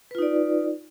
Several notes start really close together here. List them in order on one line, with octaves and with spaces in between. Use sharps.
B4 F4 D#4 D5